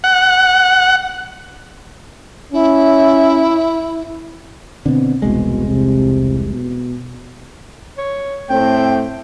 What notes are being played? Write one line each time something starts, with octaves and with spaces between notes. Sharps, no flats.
F#5
C#4 E4
B2 D3 C4
E1 C2 B2 G#3
C3
B2
C#5
A2 A3 C4 G5